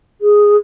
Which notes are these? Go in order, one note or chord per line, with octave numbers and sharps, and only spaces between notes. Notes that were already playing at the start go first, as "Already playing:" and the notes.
G#4